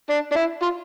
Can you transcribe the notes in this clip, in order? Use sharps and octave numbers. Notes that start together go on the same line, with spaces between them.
D4
D4
E4
F4